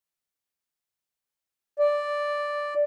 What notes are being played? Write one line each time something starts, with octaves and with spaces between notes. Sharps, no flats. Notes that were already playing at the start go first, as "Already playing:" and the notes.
D5